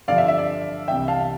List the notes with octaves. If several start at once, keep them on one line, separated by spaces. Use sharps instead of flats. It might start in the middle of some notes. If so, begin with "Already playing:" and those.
G2 D3 F3 D5 F5
E5
E5
D5
C2 C3 E3 E5 G5
F5 A5